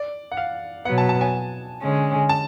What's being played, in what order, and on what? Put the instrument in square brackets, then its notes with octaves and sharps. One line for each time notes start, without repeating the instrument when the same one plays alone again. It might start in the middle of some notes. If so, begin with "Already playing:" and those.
Already playing: [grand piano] D5
F#5
F5
[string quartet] B2 F#3 B3 [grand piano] F#5
[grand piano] A5
A5
G#5
[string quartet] D3 G#3 C#4
[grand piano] A5